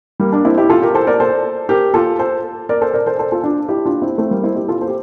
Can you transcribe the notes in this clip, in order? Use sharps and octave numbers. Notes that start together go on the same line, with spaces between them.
G3 A#3
A#3 D4
C4 E4
E4 G4
F4 A4
G4 A#4
A4 C5
A#4 D5
A4 C5
G4 A#4
F4 A4
A4 C5
A#4 D5
A4 C5
A#4 D5
A4 C5
A4 C5
F4 A4
D4 F4
E4 G4
D4 F4
C4 E4
A3 C4
G3 A#3
C4 E4
E4 G4
F4 A4
A4 C5
G4